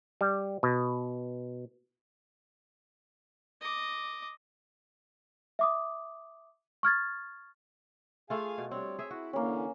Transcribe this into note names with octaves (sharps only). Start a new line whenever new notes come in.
G3
B2
D#5 D6
E5 D6 D#6
C#6 F6 G#6 A6
A3 F4 G#4 F5 G#5
B2
G3 C4 D4 C#5
G#4 C#5 E5
E4 F#4
D3 E3 A#3 C#4